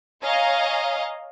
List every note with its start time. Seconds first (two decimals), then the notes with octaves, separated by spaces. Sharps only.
0.22 C#5 D#5 F5 G#5 A#5